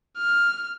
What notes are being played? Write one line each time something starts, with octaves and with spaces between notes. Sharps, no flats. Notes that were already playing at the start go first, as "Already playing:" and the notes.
F6